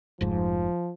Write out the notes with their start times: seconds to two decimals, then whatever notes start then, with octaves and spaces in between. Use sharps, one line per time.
0.21 F1 G#2 F3